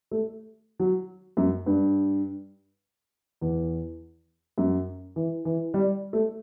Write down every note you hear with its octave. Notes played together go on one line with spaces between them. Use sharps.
A3
F#3
F#2
G2
E2
F#2
E3
E3
G3
A3